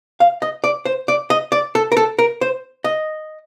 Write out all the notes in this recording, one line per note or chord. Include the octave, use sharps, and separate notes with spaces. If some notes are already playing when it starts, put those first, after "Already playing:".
F5
D#5
D5
C5
D5
D#5
D5
A4
A#4
A4
A#4
C5
D#5